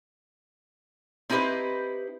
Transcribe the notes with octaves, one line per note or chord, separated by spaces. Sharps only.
C4 D#4 E4 G4 B4 C5